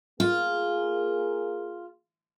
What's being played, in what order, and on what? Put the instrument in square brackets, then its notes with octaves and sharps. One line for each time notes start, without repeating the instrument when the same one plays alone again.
[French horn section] A#3 G#4 [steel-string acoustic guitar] F4